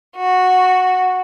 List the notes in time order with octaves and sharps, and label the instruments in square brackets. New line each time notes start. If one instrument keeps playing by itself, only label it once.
[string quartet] F#4